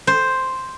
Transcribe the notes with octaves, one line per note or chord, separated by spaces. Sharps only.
C5